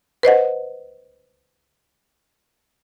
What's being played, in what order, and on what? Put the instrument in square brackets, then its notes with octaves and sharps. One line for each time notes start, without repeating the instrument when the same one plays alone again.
[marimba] B4 C5 D#5 F#5